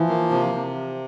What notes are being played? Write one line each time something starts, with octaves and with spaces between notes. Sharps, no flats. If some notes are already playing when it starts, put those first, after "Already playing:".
Already playing: E3 F3
A#3
C3
C3